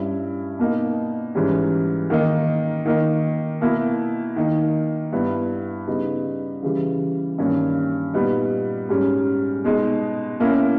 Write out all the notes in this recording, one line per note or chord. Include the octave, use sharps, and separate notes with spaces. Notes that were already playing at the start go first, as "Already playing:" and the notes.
Already playing: G2 G3 C#4 E4
B2 A#3 D#4
G#2 E3 G3 C#4
D#3 A#3 D#4
D#3 A#3 D#4
B2 A#3 E4
D#3 A#3 D#4
G2 G3 B3 E4
C#3 G3 B3 D#4
C#3 E3 G3
G2 D#3 A#3 C#4
A#2 G3 B3 D#4
G#2 G3 C#4
B2 G#3 D#4
B2 A#3 C#4 E4